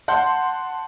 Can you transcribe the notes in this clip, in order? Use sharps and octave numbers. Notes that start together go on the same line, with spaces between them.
F#5 A5 C6 G6